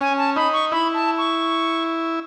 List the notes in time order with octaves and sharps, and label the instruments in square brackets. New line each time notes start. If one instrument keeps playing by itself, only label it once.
[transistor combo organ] C#4 [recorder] G#5
[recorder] A5
[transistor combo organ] D#4 [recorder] B5
[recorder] C#6
[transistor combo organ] E4 [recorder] B5
[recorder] A5
C#6